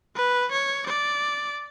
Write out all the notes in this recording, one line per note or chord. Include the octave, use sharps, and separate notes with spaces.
B4
C#5
D5